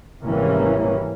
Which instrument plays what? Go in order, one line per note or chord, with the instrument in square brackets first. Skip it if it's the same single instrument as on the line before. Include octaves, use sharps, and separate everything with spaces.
[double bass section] G#1 C3 E3 G3 A#3 C#4